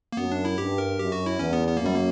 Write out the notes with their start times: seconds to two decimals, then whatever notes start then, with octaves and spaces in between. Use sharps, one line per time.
0.13 A#3
0.17 F#2 B3
0.31 D4
0.45 E4
0.58 G2 G4
0.78 A#4
0.99 F#2 G4
1.12 F#4
1.26 E4
1.39 E2 C#4
1.53 B3
1.68 B3
1.77 F#2 A#3
1.86 G3
1.96 A#3